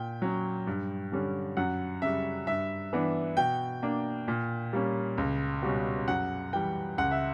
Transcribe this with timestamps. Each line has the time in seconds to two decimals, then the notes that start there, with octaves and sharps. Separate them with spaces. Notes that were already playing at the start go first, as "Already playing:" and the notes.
Already playing: A#2 G5
0.22 F#3 C#4
0.67 G2
1.12 D3 G3 C#4
1.57 F#2 F#5
2.02 C#3 G3 E5
2.47 G2 E5
2.93 E3 B3 D4
3.37 B2 G5
3.82 A#3 D4
4.28 A#2
4.73 G3 A#3 C#4
5.18 C#2
5.63 B2 G3 C#4
6.08 F#2 F#5
6.53 E3 G3 G5
6.98 C#2 F#5
7.11 E5